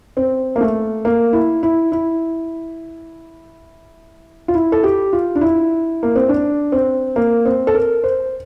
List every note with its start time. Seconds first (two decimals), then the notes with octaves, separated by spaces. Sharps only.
0.17 C4
0.56 A#3
0.61 A3
1.05 A#3
1.33 E4
1.63 E4
1.92 E4
4.48 F4
4.55 E4
4.72 A4
4.84 G4
5.13 F4
5.35 D4
5.41 E4
6.03 A#3
6.16 C4
6.29 D4
6.72 C4
7.16 A#3
7.45 C4
7.67 A4
7.75 A#4
8.04 C5